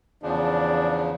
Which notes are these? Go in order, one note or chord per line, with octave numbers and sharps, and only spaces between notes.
E2 C#3 F3 D4